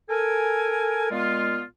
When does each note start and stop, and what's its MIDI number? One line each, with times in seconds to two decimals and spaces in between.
0.09 1.11 69
0.09 1.11 70
0.09 1.11 80
1.11 1.62 46
1.11 1.62 56
1.11 1.62 59
1.11 1.62 65